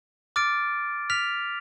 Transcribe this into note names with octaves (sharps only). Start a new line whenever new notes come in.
D6 F6 A6 D7
F6 B6 F7